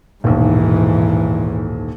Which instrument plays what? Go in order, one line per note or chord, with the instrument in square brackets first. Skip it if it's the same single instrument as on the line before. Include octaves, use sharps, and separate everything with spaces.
[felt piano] D#1 B1 [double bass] G#2 E3